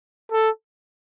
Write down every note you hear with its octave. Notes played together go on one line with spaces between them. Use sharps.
A4